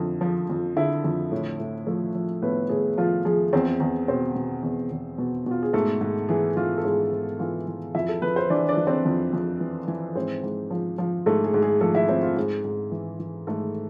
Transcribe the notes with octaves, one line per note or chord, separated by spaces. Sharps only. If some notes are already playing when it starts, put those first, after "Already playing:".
Already playing: F2 D3 E4
F3
F2
D3 E4 E5
F2
A2
A2
F3 A3 A4
F3
A2 B3 B4
A2 G#4
F3 F4
F3 G#4
E2 C4 C5
E2
B2 C4 C5
B2
E2
E2
B2
B2 F4
G#4
G#2 A3 A4
G#2
E3 G#4
E3 F4
A4
G#2 G#4
G#2
E3 F4 F5
E3
F2 E4 E5
A4
F2 B4
C5
E3 D4 D5
D4 D5
E3
C4 C5
F2
F2
E3
E3
G#2 C4 C5
G#2
F3
F3
G#2 A3 A4
G#4
G#2
G#4
F3 A3 A4
E4 E5
F3 C4 C5
F4
G#2 G#4
G#2
E3
E3
G#2 A3 A4